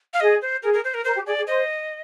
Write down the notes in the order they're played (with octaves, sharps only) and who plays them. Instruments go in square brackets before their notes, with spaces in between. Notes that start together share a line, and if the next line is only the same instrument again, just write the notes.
[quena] F5
[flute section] G#4 [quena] D#5
[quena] C5
[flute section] G#4 [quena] A#4
[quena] A#4
C5
A#4
[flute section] A#4 [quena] C5
[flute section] G4
[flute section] G#4 [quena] D5
[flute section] G#4
[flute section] C5 [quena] D#5